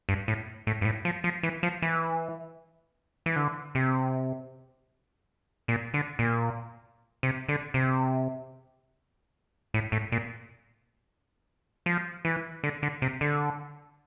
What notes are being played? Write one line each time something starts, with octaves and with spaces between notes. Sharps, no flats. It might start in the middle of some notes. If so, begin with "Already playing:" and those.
G2
A2
A2
G2
A2
F3
F3
E3
F3
E3
E3
D3
C3
A#2
D3
A#2
C3
D3
C3
A2
A2
A#2
F3
E3
D3
D3
C3
D3